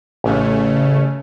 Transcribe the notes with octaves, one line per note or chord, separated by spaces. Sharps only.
A1 C#3 A3 C#4